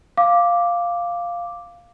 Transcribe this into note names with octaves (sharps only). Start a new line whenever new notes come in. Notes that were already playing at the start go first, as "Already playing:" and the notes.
F5 D6